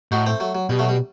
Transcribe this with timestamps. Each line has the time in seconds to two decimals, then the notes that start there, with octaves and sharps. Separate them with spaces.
0.12 A2 D#4 F#4
0.26 A3 C4
0.40 F#3 A3
0.55 F#3
0.69 B2 G3
0.79 F#3 A3
0.89 G3